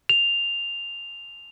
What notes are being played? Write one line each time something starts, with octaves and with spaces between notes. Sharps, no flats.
F7